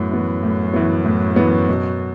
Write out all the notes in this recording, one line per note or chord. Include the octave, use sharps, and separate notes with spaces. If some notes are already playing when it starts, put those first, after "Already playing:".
Already playing: F#2 A2 E3 B3
E3 B3
A2
E3 B3
A2
E3 B3
B2